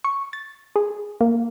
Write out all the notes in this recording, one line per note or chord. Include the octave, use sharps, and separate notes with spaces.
C#6
A6
G#4
A#3